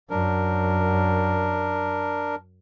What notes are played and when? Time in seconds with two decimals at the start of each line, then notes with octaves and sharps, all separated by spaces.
0.10 F#2 D4 A#4